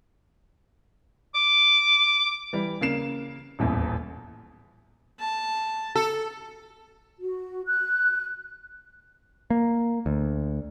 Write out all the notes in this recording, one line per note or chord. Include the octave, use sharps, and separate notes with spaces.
D6
E3 G3
C#3 A#3 C7 E7
D#1 A1 E2
A5
A4
F#4
F#6
A#3
D2